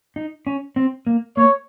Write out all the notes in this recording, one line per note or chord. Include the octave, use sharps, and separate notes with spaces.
D#4
C#4
C4
A#3
A#3 C#5